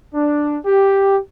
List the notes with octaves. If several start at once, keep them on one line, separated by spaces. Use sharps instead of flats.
D4
G4